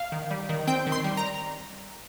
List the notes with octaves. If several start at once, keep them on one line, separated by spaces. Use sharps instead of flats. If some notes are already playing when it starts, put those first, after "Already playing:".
Already playing: F5
D#3
G3
D#3
C4 G5
D#3
C6
G3
A#5